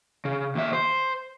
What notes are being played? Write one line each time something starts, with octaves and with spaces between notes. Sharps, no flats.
C#3
D#2 E5
C5